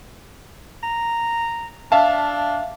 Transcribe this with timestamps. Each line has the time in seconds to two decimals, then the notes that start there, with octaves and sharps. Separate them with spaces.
0.83 A#5
1.92 D4 E5 F5 A5